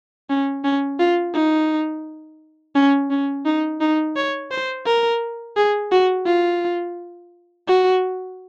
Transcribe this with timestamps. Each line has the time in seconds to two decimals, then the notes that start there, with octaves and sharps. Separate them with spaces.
0.29 C#4
0.64 C#4
0.99 F4
1.34 D#4
2.75 C#4
3.10 C#4
3.46 D#4
3.81 D#4
4.16 C#5
4.51 C5
4.86 A#4
5.57 G#4
5.92 F#4
6.27 F4
7.67 F#4